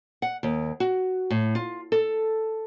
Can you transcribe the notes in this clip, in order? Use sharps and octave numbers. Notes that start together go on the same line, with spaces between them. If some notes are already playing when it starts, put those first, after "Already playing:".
F#5
D#2
F#4
A2
F4
A4